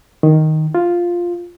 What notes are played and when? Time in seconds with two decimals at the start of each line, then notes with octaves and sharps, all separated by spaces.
0.23 D#3
0.75 F4